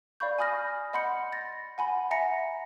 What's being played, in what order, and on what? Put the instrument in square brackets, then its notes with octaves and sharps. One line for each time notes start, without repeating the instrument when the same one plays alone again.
[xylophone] D5 F5 B5 C#6 G6
G#5 B5 D#6 F6 A#6
D#5 F#5 B5 C6 G6 C#7
A6 A#6
F#5 G#5 B5 C6
E5 F#5 G#5 A#5 A#6 C#7